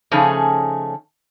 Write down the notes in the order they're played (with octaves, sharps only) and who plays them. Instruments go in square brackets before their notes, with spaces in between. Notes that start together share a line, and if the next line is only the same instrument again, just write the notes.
[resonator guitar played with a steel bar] C#3 F3 A3 C#4 D#4 G#4